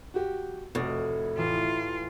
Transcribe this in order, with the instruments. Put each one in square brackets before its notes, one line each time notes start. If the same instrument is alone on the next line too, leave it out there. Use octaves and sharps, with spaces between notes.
[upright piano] F#4 G4
[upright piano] F1 F#4 [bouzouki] A2 [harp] D5 D#5 F6
[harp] A1 E3 E7 [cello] F4